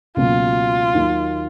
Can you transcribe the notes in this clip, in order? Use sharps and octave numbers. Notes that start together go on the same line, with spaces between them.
C#2 B2 F#3 A#3 F4
D#2 D#3 F#3 A#3